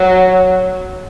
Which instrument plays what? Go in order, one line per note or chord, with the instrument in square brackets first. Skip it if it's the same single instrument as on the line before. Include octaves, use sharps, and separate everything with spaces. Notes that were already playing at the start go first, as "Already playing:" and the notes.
Already playing: [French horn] F#3